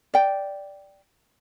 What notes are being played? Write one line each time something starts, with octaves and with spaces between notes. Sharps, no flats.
D5 G5